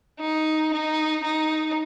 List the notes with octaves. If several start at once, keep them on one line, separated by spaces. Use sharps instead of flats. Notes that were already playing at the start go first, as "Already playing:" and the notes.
D#4
D#4
D#4